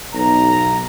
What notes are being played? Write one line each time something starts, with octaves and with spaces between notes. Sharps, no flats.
B1 A#5